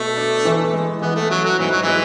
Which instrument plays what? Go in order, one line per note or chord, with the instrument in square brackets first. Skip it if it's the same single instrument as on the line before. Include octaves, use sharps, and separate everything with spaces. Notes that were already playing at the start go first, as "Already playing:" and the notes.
Already playing: [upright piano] B2 [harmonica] A3
[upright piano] D4
E3
G#3
[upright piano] E3 [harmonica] B3
[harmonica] A3
[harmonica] F#3 [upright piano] C#4
[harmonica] F#3
[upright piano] G#2 [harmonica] E3
[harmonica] F#3
[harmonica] E3 [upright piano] G#3